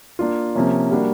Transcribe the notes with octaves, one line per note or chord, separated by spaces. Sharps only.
A#3 D4 F4
C3 F3 A#3 C#4
G3 A#3 D4 F#4